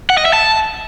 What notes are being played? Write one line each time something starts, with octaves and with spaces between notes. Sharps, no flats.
F#5
D#5
E5
A5